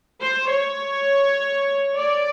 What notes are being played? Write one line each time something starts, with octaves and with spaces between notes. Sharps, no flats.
C5
C#5
D5